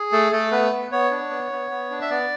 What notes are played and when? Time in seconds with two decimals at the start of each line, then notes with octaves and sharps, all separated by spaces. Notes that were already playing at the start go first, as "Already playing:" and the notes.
Already playing: G#4
0.12 A3 A4
0.32 A3 A4
0.52 B3 B4
0.72 B3
0.92 B3 C#5
1.11 D4
1.31 B3
1.51 B3
1.71 B3
1.90 D4
2.02 E5
2.10 B3 D5